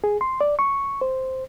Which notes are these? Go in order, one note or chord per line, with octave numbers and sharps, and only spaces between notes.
G#4
C6
D5
C#6
C5